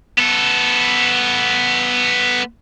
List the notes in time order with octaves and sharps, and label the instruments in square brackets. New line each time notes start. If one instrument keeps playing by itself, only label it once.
[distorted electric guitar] B3 A4